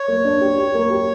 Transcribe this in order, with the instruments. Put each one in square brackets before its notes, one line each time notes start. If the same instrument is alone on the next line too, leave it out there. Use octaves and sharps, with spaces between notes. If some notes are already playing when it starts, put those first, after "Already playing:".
Already playing: [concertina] C#5
[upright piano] A#3
D4
G4
G4
A#3
G4